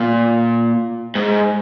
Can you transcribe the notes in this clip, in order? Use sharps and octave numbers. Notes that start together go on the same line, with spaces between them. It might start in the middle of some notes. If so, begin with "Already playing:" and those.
Already playing: A#2
G#2